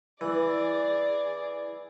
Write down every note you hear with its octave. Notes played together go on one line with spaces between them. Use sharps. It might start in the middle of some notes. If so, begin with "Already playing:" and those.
E3 G#4 D5